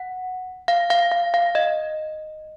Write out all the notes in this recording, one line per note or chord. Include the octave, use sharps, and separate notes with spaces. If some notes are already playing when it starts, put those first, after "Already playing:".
Already playing: F#5
F5
F5
F5
F5
D#5